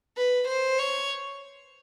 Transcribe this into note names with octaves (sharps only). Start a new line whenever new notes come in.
B4
C5
C#5